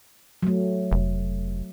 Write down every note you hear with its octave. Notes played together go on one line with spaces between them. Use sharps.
F#3 A3
F1